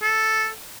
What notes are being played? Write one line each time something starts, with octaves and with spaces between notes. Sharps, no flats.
A4